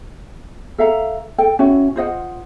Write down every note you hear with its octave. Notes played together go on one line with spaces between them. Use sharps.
A4 E5 F5 A#5
A4 G5
C#4 E4 F#4
F4 C5 D#5 F#5